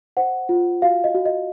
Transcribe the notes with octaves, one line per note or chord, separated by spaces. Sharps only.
C5 F#5
F4
F#4 F5
D#5
F#4
D#5